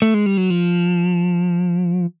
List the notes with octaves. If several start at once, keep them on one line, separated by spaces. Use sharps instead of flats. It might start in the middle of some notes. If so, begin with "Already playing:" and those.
A3
G#3
G3
F#3
F3